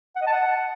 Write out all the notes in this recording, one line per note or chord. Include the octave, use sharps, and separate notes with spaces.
F#5
D#5
A5
F#5